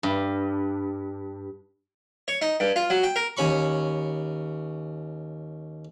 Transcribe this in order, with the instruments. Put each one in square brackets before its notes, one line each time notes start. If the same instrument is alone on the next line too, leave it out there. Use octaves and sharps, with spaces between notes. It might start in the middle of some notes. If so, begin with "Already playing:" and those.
[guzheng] G2
[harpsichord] C#5
D#4
G2
F4
F#3
G5
A#4
D#2 C#4 B5 C#6